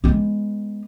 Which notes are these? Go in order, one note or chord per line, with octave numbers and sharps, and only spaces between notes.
G#3 B3